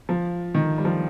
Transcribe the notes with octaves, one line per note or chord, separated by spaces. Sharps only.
F3
D#3
G3
F3